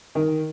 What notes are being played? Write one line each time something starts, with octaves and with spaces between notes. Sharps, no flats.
D#3